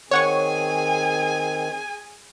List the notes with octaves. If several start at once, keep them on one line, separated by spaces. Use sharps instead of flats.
D#3 C4 G#4 C#5 F#5 G#5 C#6